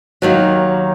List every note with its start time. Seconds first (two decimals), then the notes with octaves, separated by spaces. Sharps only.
0.22 D#2 D#3 F#3